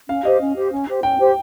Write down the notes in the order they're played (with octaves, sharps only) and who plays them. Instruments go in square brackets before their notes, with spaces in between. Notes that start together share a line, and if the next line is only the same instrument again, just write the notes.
[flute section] C#4 [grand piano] F5
[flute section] G4 C5 [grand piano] D#5
[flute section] C#4
G4 C5
C#4
G4 C5
[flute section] C#4 [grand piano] G5
[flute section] G4 C5